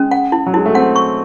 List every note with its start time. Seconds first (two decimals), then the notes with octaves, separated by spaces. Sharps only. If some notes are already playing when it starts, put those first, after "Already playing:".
Already playing: G#3 C#4
0.11 F#5
0.32 E4
0.46 F#3
0.54 G#3 E4
0.66 A3
0.75 C4 F#5
0.96 C#6